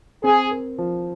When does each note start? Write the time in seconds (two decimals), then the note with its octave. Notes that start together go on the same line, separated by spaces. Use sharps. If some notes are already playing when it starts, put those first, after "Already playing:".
0.23 C4 G#4
0.51 A#4
0.78 F3